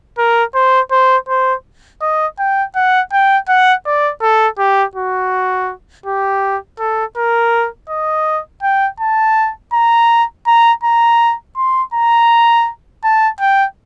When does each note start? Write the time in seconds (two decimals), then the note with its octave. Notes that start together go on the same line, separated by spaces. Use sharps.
0.18 A#4
0.55 C5
0.91 C5
1.29 C5
2.01 D#5
2.39 G5
2.76 F#5
3.13 G5
3.49 F#5
3.86 D5
4.22 A4
4.59 G4
4.95 F#4
6.06 G4
6.79 A4
7.17 A#4
7.89 D#5
8.63 G5
9.00 A5
9.73 A#5
10.47 A#5
10.84 A#5
11.57 C6
11.94 A#5
13.04 A5
13.40 G5